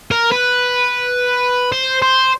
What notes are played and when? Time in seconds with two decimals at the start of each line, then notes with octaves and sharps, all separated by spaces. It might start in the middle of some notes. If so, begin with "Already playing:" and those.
0.11 A#4
0.31 B4
1.72 C5
2.02 C5